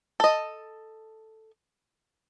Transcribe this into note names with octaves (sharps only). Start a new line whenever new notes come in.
A4 D#5